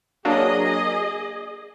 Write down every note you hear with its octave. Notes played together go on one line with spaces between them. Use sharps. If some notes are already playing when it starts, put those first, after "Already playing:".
F#3 A#3 D4 G#4 D#5